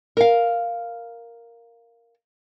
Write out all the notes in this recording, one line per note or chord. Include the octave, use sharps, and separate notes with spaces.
A#4 F5